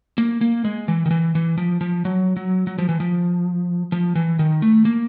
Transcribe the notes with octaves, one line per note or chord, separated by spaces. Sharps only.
A#3
A#3
G#3
E3
D#3
E3
E3
F3
F3
F#3
F#3
F#3
F3
E3
F3
F3
E3
D#3
A3
A#3